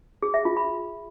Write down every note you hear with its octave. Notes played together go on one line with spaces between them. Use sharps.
G#4
E5
F4
B5